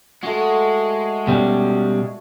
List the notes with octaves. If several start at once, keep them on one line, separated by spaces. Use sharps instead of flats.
G#3 A3 F#4
B2 G3 C#4